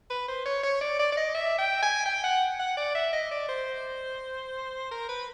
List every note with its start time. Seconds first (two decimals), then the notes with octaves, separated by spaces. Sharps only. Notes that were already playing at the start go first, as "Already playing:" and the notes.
0.10 B4
0.28 C5
0.46 C#5
0.63 C#5
0.81 D5
0.99 D5
1.12 D5
1.17 D#5
1.35 E5
1.59 G5
1.83 G#5
2.06 G5
2.24 F#5
2.60 F#5
2.77 D5
2.95 E5
3.13 D#5
3.31 D5
3.49 C5
4.91 A#4
5.09 B4